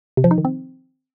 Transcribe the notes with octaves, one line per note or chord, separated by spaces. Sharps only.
C3
F3
D#4
D#3
C4